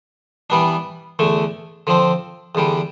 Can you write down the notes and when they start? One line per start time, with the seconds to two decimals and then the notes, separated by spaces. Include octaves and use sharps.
0.50 E3 G3 B3 D4
1.19 E2 D3 A3
1.87 D3 F3 C4
2.55 E2 D3 G3